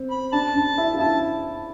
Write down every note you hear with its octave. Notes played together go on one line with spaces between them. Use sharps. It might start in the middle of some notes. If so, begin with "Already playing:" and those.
Already playing: C4
B5
D4 A5
D4
E4
F4
E4 A5